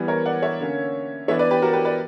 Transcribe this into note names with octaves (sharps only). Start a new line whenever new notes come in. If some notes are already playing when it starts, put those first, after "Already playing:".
Already playing: E3 G3 B3
A#4 C#5
D5 F#5
C#5 E5
D3 A#3 C#4
E3 B3 D4 C#5 E5
B4 D5
G4 B4
F#4 A#4
G4 B4
B4 D5